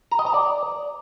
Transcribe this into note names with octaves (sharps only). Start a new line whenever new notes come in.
A#5
D#5
A#5
D5